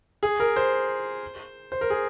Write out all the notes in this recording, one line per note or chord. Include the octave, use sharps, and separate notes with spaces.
G#4
A#4
C5
C5
A#4
G#4